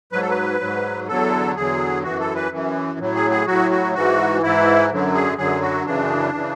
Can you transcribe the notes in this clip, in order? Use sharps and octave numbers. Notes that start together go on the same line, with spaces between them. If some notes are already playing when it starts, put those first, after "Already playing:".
G#2 F#3 B4
A4
B4
G#2 F#3
E2 D3 F#3 A4
E2 D3 F#3 G#4
F#2 E3 F#4
A4
B4
F#2 E3
A2 F#3
G#4
G#4
A2 F#3 F#4
F#4
G#2 E3 F#4
G#2 E3 E4
F#2 D3 F#3
G#4
F#2 D3 F#3 G#4
F#4
F#2 C#3 E3 D4
C#3 E3